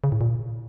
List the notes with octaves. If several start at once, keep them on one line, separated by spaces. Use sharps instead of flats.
C#3
A2
A#2